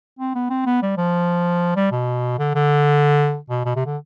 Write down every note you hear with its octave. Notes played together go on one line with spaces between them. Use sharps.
C4
B3
C4
B3
G3
F3
G3
B2
D3
D3
B2
B2
C3
D3